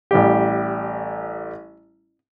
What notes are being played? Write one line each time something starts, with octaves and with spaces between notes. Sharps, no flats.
A1 G3 G4